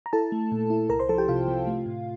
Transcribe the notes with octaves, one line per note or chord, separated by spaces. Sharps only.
A#5
E4 A4 A5
A3
A#2
E4
C2 A#4 A#5
C5 C6
F3 A4 A5
G4 G5
C3 F4 F5
C3
A3
A2